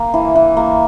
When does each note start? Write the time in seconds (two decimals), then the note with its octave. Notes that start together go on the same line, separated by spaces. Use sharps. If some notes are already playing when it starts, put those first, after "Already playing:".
Already playing: A#3
0.14 E3
0.36 E3
0.57 A#3